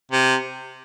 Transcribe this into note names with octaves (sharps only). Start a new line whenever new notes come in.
C3